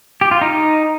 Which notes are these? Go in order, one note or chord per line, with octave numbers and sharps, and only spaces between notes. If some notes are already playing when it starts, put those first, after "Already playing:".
G4
F4
D#4